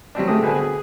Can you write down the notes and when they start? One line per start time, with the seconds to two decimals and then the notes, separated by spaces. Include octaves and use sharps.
0.15 F#3 G3 C4 D4
0.27 A2 G#3 A3 G4 D#6
0.42 B2 D3 B4 C5 G#5 A5
0.56 G#4